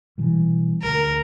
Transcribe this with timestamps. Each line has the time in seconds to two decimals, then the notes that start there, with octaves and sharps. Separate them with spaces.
0.18 B2 E3 G3
0.83 D2 A#4